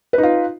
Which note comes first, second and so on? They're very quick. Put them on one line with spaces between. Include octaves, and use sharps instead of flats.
B4 D#4 F4